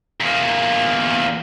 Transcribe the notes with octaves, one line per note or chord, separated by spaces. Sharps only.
E2 A#3